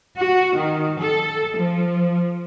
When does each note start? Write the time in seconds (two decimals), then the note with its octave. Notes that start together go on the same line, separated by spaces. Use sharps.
0.19 F#4
0.56 D#3
1.01 A4
1.56 F3